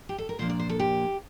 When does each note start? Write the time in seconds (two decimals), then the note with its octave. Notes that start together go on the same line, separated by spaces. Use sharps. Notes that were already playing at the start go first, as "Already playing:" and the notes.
0.09 G4
0.18 A4
0.29 A#4
0.39 A#2 F3 A#3 D4 C5
0.50 D5
0.60 C5
0.69 A4
0.79 G4